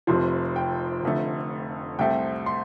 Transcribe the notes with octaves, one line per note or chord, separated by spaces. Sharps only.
F1 F2 C3 F3 C6
G5
F1 F2 D3 A3
C2 C3 A3 C4 G5
C6